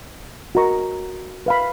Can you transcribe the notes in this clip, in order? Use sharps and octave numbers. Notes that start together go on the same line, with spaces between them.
F#4 A#4 D#5 A#5 C#6
B4 F5 B5